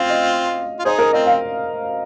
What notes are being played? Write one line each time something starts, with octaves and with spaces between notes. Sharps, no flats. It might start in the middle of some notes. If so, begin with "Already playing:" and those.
Already playing: C4 F4 F5
D#5
F4
D#4 G#4 C5
A#4
C4 F4 D#5
F5